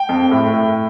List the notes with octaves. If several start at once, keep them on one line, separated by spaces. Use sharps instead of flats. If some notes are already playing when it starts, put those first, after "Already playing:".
Already playing: G5
F2
A2
A2